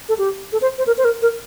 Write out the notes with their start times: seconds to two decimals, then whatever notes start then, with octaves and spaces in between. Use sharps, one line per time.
0.09 A4
0.18 G4
0.53 A4
0.62 C5
0.78 C5
0.87 A#4
0.98 C5
1.05 A#4
1.22 A#4